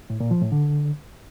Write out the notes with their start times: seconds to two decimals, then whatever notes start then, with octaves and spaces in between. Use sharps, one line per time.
0.10 A2
0.20 A#2
0.31 F3
0.41 A2
0.52 D3